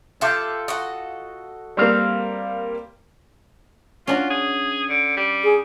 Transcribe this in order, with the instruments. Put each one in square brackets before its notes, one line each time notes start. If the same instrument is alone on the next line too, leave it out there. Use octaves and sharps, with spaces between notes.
[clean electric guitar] F4 G4 [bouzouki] A4 E5
[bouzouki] F#4 A4 D#5
[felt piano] G3 A#3 [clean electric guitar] C4 F5
[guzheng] C#4 D4 F#4 [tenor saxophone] F4
[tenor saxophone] G#4
D3
G3
[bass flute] G#4